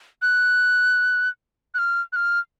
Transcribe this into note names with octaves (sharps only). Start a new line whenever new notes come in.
F#6
F#6
F6
F#6
F6